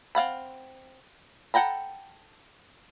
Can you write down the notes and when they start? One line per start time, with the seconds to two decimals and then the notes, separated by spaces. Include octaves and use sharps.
0.15 C4 F5 F#5 B5
1.54 A4 F#5 G5 A#5 B5